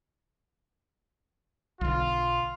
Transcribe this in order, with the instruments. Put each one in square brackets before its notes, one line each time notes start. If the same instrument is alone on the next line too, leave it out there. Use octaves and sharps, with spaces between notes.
[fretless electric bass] B1 D3 [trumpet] F4